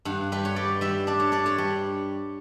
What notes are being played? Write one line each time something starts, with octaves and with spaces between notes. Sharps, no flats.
G2 F#5
G3 B4
C#5
G3 D5
G3 E5
D4 D5
C#5
D4 D5
C#5
G3